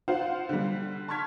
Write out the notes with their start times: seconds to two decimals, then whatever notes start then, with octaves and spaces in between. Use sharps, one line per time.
0.08 F4 C5 F5 F#5
0.49 D3 G3
1.08 A5 C6 C#6 F6 G#6 B6